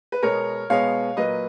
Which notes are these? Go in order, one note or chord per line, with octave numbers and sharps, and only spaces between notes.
B4
B2 G#3 B3 A#4 C#5
B2 G#3 B3 C#5 F5
A#2 F#3 A#3 B4 D#5